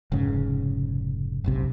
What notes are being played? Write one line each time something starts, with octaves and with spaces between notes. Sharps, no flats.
F1 G#2 C#3
F#1 B1 C3